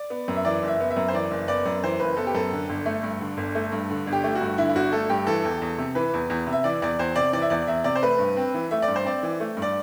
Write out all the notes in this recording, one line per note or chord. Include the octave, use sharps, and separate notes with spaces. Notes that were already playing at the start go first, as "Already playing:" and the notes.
Already playing: D5
B3
F#2
E5
E3 D5
F#1
E5
B3
E5
F#2
C5
E3 D5
F#1
B3 D5
F#2
E3 C5
F#1 B4
B3 A4
G4
F#2 A4
D3
G1
A3
G2
D3
G1
A3
G2
D3
G1
G4
A3
F#4
G2
D3 E4
E4
G1 F#4
A3 A4
G2 G4
E3 A4
E2
E2
C3
E3 B4
E2
E2
C3
E5
E3 D5
E2 D5
E2 C5
C3 D5
E3 D5
E5
E2 D5
E2 E5
C3 D5
C5
A3 B4
G2
C4
E3
A3 E5
D5
G2
C5
C4 D5
E3
A3
G2
D5